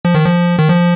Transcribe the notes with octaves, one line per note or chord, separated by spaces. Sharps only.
F3
D#3
F3
D#3
F3